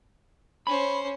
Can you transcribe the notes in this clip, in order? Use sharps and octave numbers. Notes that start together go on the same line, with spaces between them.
C#4 C5 B5